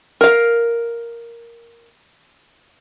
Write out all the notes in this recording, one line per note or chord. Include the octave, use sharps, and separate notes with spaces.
A#4 F5